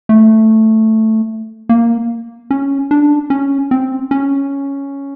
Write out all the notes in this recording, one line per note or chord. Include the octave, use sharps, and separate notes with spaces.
A3
A#3
C#4
D4
C#4
C4
C#4